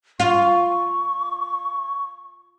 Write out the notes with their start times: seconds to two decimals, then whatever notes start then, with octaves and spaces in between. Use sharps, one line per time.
0.20 F4 C#6